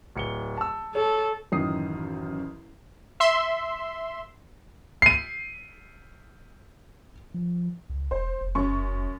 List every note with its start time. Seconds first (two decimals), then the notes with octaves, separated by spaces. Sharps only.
0.15 D1 C#7 G7
0.57 A5 E6
0.95 A4 C#5
1.52 A1 F#2 D#3 D#6 C7
3.20 E5 C6
5.02 C7 D#7
7.34 F3
7.90 C#2
8.11 E1 C5
8.41 F1
8.55 F#2 C#4 C#6